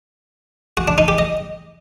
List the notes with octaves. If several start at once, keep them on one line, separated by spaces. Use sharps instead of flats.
F#4
D4
D#4
G4
D#5